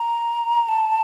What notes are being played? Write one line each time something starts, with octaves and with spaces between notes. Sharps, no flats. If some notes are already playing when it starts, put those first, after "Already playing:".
Already playing: A#5
A5